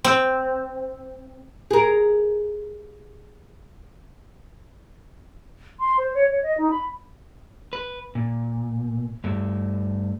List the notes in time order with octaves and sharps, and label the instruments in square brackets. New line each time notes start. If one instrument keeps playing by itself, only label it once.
[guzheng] C4
[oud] G#4 A#4
[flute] C6
C5
C#5
C#5
D#5
D#4
B5
[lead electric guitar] B4
A#2
G2 A3